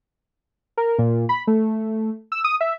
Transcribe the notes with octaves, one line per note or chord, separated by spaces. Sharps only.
A#4
A#2
B5
A3
E6
D#6
E5